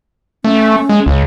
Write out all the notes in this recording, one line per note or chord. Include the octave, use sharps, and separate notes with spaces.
A3 C#4
G#3
C#2